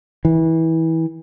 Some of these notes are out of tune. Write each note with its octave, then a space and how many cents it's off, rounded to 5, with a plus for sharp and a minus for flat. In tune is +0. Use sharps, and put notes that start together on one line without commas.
E3 -25